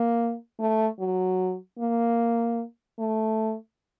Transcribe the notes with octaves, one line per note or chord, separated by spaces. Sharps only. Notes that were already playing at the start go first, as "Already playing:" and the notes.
Already playing: A#3
A3
F#3
A#3
A3